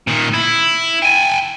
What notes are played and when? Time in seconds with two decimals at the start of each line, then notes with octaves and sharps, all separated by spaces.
0.07 A#2 D#3
0.34 E4
1.02 G5 G#5